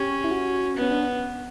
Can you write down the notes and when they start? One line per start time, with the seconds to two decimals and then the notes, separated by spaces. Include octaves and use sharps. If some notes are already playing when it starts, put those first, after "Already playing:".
Already playing: C#4 G4
0.24 E4
0.31 F#4
0.76 B3
0.81 C#4
0.91 D4